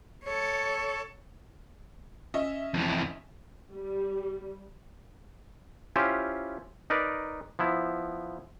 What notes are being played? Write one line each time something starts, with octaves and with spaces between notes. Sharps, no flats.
A4 C#5
C#4 D#5 E5
F2 E3
G3
C#4 E4 F4 G4 C5
D#4 A#4 B4 D5
F3 B3 E4